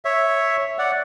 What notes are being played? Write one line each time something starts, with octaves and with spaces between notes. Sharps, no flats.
C#5 E5
D5 F#5